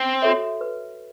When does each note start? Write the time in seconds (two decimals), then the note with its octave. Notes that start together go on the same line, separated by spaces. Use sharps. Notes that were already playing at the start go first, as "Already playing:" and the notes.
Already playing: C4
0.22 F#4 A4 C#5 E5
0.61 B4